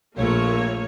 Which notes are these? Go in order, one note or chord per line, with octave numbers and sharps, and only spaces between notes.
A#1 A3 A#3 C#5